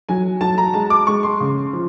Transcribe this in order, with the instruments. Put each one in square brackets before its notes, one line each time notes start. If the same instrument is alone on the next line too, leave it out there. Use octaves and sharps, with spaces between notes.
[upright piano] F#3 G#5
F#3 A5
A#5
G#3 A5
D6
G#3 C#6
C6
C#3
F3